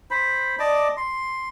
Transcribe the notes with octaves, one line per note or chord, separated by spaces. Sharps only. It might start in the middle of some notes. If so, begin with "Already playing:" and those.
C5 B5
D5 D#5 A5 D6
C6